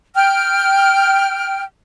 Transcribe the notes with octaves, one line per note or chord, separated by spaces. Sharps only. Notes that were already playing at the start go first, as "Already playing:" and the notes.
G5 F6